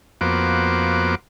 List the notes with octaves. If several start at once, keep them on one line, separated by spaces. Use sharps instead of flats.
F2 A#3 B3 F#4 C5 D6